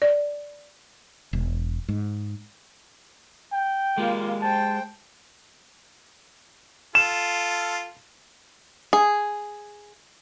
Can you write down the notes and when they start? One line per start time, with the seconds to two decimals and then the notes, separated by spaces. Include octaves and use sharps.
0.02 D5
1.33 E1
1.89 G#2
3.52 G5
3.98 G#3 A#3 F4 G4
4.42 C5 G5 A5
6.95 F4 A4 E7
8.93 G#4